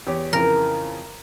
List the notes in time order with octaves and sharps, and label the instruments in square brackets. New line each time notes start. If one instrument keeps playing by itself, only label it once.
[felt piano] E2 G4 C#5
[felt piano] F2 C#3 E3 [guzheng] A#4